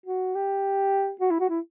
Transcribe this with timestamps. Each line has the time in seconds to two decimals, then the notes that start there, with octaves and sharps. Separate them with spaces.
0.06 F#4
0.35 G4
1.21 F#4
1.31 E4
1.40 F#4
1.49 E4